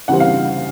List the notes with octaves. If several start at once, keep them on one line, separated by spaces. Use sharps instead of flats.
C#3 E3 G3 C4 F#5
F5